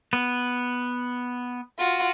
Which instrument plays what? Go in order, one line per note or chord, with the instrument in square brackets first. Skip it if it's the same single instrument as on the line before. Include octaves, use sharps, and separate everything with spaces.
[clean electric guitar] B3
[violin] F4 F#4